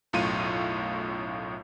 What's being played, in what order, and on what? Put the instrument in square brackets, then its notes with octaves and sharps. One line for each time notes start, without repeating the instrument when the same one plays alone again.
[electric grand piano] B1 F#2 A2 F4 C#6 D#7